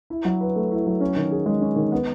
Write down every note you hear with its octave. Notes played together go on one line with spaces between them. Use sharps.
E4
F#3
B4
A3
E4
F#3
C#4
D#3
G#4
G#3
C#4
D#3
B3